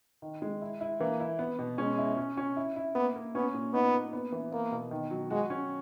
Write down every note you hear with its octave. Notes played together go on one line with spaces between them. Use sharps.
D#3
G#3
E4
E4
E3 A#3
E4
B3
B2
G#3 C#4
E4
C#4
C#4
E4
E4
A#3 B3
A#3
B3 C#4
A#2
B3 D#4
A#3
B3
E3
A#3 B3
B2
D#3
F#3
G#3 F#4
C#4